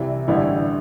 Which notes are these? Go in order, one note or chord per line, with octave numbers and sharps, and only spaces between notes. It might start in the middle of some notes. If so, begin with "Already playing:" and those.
Already playing: C2 C3 E3 E4
A1 G2 D3 E3 E4